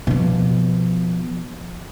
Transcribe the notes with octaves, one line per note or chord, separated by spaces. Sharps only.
B2 F3